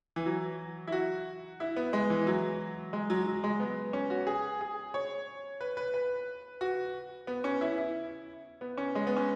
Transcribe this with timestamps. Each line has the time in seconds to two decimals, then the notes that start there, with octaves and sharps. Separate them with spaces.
0.16 E3
0.26 F#3
0.87 E4
0.92 F#4
1.60 E4
1.76 B3
1.93 G#3
2.10 E3
2.27 F#3
2.93 G#3
3.10 F#3
3.26 F#3
3.44 G#3
3.60 B3
3.93 C#4
4.10 F#4
4.27 G#4
4.61 G#4
4.94 C#5
5.61 B4
5.77 B4
5.94 B4
6.61 F#4
7.27 B3
7.44 C#4
7.61 E4
7.78 E4
8.61 B3
8.77 C#4
8.95 G#3
9.07 B3
9.16 C#4